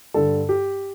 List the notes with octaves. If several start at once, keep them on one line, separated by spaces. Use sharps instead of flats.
G2 D3 A4
G4